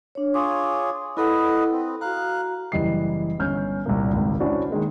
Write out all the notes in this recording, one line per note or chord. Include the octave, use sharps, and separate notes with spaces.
D4 C#5
F4 G#4 C#5 D6
E4 A4 B4 D#5 F#5
C4
F#4 F5 A#5 F#6
F#1 E3 G3 D#5 C7
G1 C#4 F6 G6
C2 A#2 A#3
G#1 C#2
C#4 D4 E4 F#4 C5
D#3 G#3 A#3